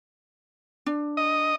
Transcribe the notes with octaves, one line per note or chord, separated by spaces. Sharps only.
D4
D#5